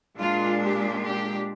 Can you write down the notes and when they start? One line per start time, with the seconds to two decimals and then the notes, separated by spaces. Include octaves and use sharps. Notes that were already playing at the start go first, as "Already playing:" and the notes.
0.20 A#2 G#3 D4 F4
0.63 G4
1.05 G4